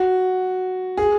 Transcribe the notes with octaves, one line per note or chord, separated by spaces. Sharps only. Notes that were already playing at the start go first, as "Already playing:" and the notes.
Already playing: F#4
G#4